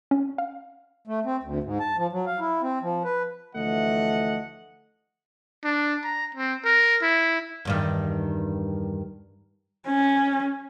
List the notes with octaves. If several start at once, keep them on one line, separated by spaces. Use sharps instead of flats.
C#4
F5
A3
C4
D2
G#2
A5
F3
F#3
F5
E4
C4
F3
B4
D2 E3 F3 A3 D#5 F#5
D4
A#5
C4
A#4
E4
E2 G2 D#3
C#4